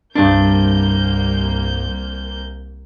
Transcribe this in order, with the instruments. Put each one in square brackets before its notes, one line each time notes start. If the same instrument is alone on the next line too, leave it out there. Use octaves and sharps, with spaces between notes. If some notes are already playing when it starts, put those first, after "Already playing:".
[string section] C2 A#3 G6 [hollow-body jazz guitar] G2 D4